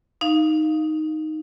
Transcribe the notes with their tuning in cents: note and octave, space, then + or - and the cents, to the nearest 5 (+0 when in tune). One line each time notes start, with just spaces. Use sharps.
D#4 +0 F5 +0